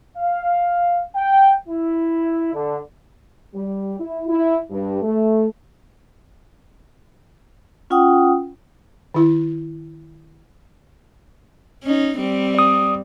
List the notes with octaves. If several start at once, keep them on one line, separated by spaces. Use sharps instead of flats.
F5
G5
E4
D3
G3
E4
E4
G2
A3
C#4 F4 F#5 G5 D#6
D#3 E4
C#4 D#4
G3 C4
D5 D#6